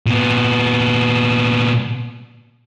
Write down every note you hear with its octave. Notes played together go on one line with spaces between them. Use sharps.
A#2 B3